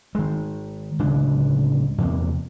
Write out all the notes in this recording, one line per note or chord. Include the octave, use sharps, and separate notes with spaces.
D#3 G#3
D1 C#3 G#3 D4
E2 C3 A#3